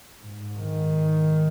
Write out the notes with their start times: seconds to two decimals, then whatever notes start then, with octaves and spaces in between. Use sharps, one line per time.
0.19 G#2
0.58 D#3